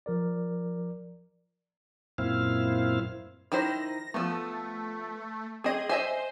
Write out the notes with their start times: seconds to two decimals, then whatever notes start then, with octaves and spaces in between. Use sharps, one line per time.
0.06 F3 A#4 D5
2.18 F#2 A#2 C4 E4 F5
3.52 D#3 E4 C5 A#6
4.14 F3 A3 B3
5.64 C4 G#4 D#5
5.89 C5 D#5 E5 G#5